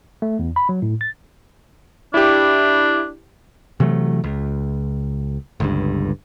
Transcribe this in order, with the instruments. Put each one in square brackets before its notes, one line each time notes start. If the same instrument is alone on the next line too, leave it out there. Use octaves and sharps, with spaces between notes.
[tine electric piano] A3
E2
B5
F#3
A2
A6
[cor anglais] D4 [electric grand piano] E4 G4
[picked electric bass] C3 E3 F#3 A3
C#2
G1 C#2 G2